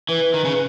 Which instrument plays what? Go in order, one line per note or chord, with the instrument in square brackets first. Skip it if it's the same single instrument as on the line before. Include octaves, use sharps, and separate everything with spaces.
[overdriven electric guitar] E3 [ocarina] B4
[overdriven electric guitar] D#3
C#3